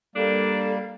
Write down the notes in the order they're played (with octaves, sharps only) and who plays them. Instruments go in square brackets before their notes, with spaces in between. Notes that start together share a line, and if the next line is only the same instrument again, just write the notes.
[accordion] G3 A#3 [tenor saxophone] D4 [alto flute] A4